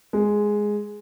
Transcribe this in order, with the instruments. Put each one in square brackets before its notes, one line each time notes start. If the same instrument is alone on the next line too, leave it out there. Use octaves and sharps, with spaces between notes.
[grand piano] G#3